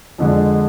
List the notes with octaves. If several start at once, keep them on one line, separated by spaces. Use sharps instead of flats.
F2 D3 G#3 D4